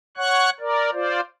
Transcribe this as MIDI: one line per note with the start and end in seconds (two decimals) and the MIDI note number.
0.17 0.50 73
0.17 0.50 78
0.17 0.50 85
0.17 0.50 90
0.60 0.90 70
0.60 0.90 74
0.93 1.20 65
0.93 1.20 72
0.93 1.20 74